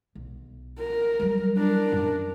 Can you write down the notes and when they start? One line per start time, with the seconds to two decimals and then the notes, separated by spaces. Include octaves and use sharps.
0.15 B1
0.79 A#4
1.20 F#3 G3
1.57 D4 A#4
1.92 F#2